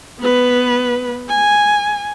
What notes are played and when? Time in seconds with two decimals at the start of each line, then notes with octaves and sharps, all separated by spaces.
0.20 B3 B4
1.29 G#5